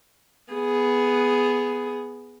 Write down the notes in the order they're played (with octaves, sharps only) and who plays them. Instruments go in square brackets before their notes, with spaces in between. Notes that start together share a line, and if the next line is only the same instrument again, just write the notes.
[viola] B3 G#4